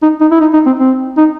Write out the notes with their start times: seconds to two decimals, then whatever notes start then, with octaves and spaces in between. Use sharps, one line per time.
0.02 D#4
0.21 D#4
0.31 E4
0.41 D#4
0.53 D#4
0.66 C4
0.80 C4
1.18 D#4